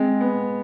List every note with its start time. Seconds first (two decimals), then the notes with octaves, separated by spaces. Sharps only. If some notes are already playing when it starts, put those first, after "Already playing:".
Already playing: G#3 C4
0.21 B3